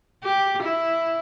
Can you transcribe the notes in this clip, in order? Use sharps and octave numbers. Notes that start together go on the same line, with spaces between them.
G4
E4